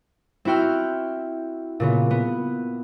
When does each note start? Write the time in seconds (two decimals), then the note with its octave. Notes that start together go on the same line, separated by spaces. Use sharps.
0.45 C4 E4 F#4 G5 F6
1.80 A#2 C#3 B3
2.11 B3